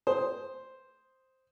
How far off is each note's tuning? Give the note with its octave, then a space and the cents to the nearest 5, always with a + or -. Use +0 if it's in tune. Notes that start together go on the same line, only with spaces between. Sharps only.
C5 +0 D#6 +5